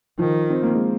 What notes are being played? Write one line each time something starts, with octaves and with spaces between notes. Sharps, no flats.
D#3 F3
C4
A#3
G#3